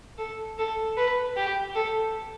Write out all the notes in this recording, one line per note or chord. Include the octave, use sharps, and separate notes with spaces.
A4
A4
B4
G4
A4